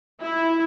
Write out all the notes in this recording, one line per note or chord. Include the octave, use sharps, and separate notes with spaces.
E4